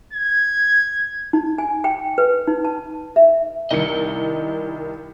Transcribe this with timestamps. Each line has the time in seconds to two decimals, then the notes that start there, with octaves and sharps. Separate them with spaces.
0.13 G#6
1.33 D#4
1.58 G#5
1.84 G5
2.18 B4
2.48 D#4
2.65 A5
3.16 E5
3.71 C2 D#3 E4 D#5 C#7